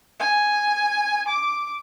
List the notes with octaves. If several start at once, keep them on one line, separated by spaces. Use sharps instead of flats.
G#5
D6